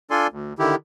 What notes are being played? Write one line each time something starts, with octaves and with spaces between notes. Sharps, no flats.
D4 F4 A4 D5 G#5 C6
D2
D3 D#3 E4 G4